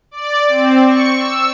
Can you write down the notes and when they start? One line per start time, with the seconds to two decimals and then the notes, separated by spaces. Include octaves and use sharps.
0.11 D5
0.48 C4
0.87 C#6
1.18 E6